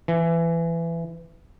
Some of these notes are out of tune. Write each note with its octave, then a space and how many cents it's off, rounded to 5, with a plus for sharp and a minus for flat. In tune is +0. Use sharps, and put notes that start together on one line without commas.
E3 +20